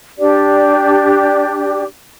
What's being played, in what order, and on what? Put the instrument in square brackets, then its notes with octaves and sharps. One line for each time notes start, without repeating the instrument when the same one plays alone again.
[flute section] D4 G4 D5